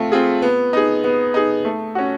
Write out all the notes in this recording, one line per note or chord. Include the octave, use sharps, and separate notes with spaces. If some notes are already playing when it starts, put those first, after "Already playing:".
Already playing: A3 C4 F4
C4 F4 G#4
B3
D#4 G#4
B3
D#4 G#4
A3
C#4 F#4